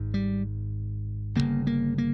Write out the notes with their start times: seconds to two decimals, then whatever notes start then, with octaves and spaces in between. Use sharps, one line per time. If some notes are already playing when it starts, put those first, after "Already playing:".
Already playing: G#1 G#2
0.14 G3
1.36 G1 F#2 C#3 A#3
1.67 A#3
1.98 A#3